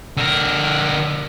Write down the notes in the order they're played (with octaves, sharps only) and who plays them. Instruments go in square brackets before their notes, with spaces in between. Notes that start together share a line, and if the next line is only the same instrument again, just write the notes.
[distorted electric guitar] D3 A#4